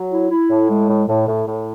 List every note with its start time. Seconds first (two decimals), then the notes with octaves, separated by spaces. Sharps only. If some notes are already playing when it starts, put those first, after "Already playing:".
Already playing: F#3
0.11 E4
0.30 E4
0.49 A2
0.69 G#3
0.88 A2
1.07 A2
1.27 A2
1.46 A2